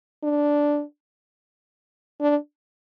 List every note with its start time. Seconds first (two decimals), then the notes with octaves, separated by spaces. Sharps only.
0.23 D4
2.21 D4